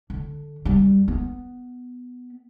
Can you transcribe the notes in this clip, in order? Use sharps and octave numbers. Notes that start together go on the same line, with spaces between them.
D3
F#2 G3
B3